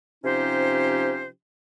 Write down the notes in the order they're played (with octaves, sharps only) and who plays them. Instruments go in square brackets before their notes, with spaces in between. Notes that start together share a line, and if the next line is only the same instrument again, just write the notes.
[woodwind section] C3 F3 C#4 D#4 G4 C5